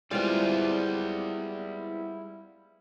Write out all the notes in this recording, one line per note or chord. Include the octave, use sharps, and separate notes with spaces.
G3 G#3 B3 C4 E4 F4 D5